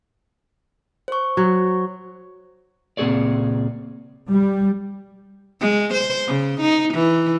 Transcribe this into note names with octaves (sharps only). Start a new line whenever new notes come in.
C5 C#6
F#3
C#2 A#2 C4 G#4 C#5 D5
G3
G#3
C5
C#3
D#4
E3